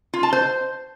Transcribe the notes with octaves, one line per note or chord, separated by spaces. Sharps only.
F4
A5
C5